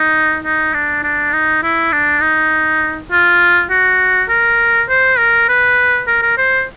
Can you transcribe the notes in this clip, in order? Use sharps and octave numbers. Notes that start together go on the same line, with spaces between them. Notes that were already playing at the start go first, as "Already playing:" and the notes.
Already playing: D#4
D#4
D4
D4
D#4
E4
D4
D#4
F4
F#4
A#4
C5
A#4
B4
A#4
A#4
C5